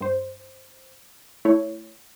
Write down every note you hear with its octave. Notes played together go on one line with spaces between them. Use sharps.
G2 C5
A3 E4 C#5